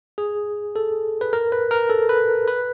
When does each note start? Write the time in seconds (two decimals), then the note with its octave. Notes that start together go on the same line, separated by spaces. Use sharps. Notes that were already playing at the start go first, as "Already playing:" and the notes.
0.18 G#4
0.76 A4
1.21 B4
1.33 A#4
1.52 B4
1.71 A#4
1.90 A4
2.09 B4
2.48 B4